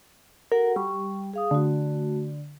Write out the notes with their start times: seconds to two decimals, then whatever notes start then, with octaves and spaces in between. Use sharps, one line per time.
0.52 F#4 A4 A#4 F#5
0.76 G3 C#6
1.34 G#4 F5 D#6
1.51 D3 A3 F#4